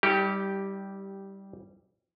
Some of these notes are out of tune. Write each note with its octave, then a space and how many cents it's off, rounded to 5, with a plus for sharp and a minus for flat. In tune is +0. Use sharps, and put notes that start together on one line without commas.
G3 -10 D#4 +45 G4 +0